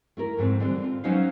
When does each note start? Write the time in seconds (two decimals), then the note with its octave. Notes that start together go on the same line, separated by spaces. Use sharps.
0.17 A3 E4 A#4
0.37 F2 G#2 A3 C4
0.60 D3 E3 G3 C4
0.81 C4 F4
1.04 F#3 B3 C#4 D#4 C5 F5